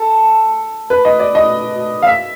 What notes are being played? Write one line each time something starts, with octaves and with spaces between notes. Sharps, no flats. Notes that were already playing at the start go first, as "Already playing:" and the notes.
Already playing: A4
B4
D#5
D5
D#5
F5
E5